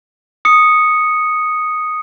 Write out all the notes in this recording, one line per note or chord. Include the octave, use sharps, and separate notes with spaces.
D#6 C#7